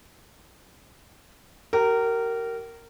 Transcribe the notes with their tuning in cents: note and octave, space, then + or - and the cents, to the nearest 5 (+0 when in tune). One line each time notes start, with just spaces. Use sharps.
G4 -40 A#4 -15